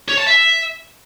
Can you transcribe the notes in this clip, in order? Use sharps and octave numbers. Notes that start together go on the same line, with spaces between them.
C#5
A5
E5